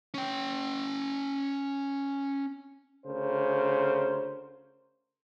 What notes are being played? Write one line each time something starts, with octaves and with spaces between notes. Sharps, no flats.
C#4 G5
D2 C#3 A#4 C5